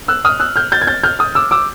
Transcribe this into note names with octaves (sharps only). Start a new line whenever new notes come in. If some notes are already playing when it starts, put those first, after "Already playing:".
E6 F#6
D#6 F6
E6 F#6
F6 G6
G6 A6
G#6
G6 A6
F6 G6
D#6 F6
D6 E6
D6 E6